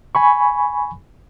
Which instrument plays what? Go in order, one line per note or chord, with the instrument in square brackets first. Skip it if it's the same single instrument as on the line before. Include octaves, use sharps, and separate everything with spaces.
[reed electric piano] G#5 B5 C#6